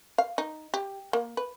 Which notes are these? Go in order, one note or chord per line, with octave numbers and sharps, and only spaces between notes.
F5
D#4
G4
A#3
B4